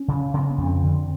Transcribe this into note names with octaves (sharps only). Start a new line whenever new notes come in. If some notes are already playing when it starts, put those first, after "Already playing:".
Already playing: C#4
C#3
C#3 C4
B3
F2
C4
D3